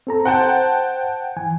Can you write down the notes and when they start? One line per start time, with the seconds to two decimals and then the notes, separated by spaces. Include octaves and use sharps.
0.07 C4 A4 A#5
0.25 C5 F#5 G5 A5
1.37 E3 G#5